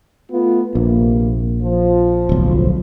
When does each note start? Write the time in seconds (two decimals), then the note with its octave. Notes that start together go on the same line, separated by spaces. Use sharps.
0.31 A3 B3 F4
0.75 A#1 C3 A#3
1.63 F3
2.29 D1 B1